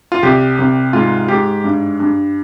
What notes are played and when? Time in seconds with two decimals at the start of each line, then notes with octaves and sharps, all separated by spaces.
0.12 F4
0.23 C2 G4
0.59 C2
0.93 G#2 F4
1.28 G#2 G4
1.64 G2
2.00 G2